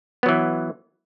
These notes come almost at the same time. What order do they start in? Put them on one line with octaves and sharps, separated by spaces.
B3 F#3 E3